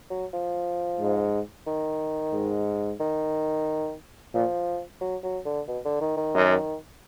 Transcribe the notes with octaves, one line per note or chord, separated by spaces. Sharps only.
F#3
F3
G#2
D#3
G#2
D#3
A#2 F3
F#3
F#3
D3
B2
D3
D#3
D#3
F#2